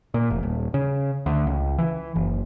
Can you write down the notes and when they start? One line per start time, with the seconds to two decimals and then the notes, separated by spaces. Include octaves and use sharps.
0.14 A#2
0.31 F1
0.43 D#1
0.74 C#3
1.26 D2
1.47 C#2
1.78 E3
2.16 F#1